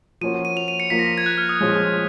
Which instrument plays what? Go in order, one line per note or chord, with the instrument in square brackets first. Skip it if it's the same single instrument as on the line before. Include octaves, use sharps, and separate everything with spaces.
[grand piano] F3 A#3 C#4 F#4 [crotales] D#7
[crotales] D#7
F7
D#7
C#7
[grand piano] F3 A#3 F4 [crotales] B6
[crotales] A#6
G#6
F#6
F6
D#6
[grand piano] A#2 F3 G#3 C#4 F4